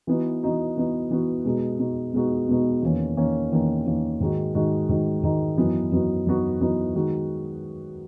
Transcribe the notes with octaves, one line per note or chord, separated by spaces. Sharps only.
E3 B3 D#4 F#4
E3 B3 D#4 F#4
E3 B3 D#4 F#4
E3 B3 D#4 F#4
B2 G#3 B3 D#4 F#4
B2 G#3 B3 D#4 F#4
B2 G#3 B3 D#4 F#4
B2 G#3 B3 D#4 F#4
E2 D#3 A#3 C#4
E2 D#3 A#3 C#4
E2 D#3 A#3 C#4
E2 D#3 A#3 C#4
G#2 D#3 G#3 D#4 F#4
G#2 D#3 G#3 D#4 F#4
G#2 D#3 G#3 D#4 F#4
G#2 D#3 G#3 D#4 F#4
F#2 E3 B3 D#4 F#4
F#2 E3 B3 D#4 F#4
F#2 E3 B3 D#4 F#4
F#2 E3 B3 D#4 F#4
D#3 G#3 D#4 F#4